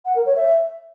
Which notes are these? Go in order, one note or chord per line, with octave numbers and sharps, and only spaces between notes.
F#5
A#4
C#5
E5